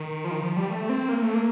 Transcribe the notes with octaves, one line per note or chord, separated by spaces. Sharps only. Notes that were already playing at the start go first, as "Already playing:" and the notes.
Already playing: D#3
F3
D#3
F3
G3
A3
C4
A#3
A3
A#3